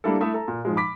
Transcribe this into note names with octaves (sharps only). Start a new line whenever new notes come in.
G3 A#3 D4 E4 A4
A3 E4 A4 E5 D#6
A4 A#5
A#2
G#2 F3 G#3
B5 D6 B6